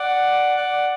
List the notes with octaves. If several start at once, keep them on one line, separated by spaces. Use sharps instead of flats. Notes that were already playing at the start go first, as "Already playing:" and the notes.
Already playing: D5 F#5
D5 F#5